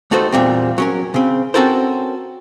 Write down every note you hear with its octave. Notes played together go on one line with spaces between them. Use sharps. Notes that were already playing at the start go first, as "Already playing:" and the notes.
D#2 A3 D#4 F#4 A4 C5
E2 A#2 G3 C4
F#3 C#4 A#4
C#3 C4
C4 C#4 F#4 A4 A#4 C5